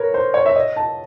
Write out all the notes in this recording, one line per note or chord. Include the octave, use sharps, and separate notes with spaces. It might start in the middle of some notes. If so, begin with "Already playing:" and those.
Already playing: A#4 B4 C#5
C5
C#5
E5
D#5
A5